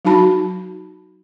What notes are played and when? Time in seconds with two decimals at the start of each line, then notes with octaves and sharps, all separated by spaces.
0.05 F#3 D#4 F#4 A5 B5